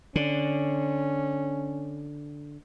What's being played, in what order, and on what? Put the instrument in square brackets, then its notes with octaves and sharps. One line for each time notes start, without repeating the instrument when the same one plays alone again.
[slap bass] D3 [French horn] C#4